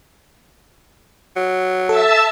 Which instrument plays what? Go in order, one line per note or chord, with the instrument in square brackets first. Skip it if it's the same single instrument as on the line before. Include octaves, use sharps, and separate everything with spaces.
[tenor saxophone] F#3
[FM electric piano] A4 [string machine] E5 A5 E6